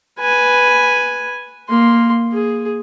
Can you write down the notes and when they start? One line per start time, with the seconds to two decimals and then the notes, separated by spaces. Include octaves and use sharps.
0.19 B4 G#5
1.69 A#3 C6
2.33 G#4